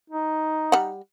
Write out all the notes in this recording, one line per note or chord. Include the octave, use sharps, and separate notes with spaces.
D#4
G3 F#5